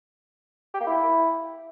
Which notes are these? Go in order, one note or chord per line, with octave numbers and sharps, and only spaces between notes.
G4
A#3
E4